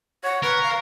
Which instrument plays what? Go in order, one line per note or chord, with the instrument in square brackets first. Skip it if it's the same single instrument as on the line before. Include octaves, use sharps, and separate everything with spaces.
[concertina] C#5 [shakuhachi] F#5
[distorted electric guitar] A#4 [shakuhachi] B4 [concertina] C#6
[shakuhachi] F5